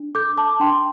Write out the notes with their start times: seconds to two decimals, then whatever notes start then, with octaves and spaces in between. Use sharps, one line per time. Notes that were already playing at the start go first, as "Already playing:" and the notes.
Already playing: D4
0.15 A4 D6 G6
0.37 A5 D6
0.60 D4 G5 C6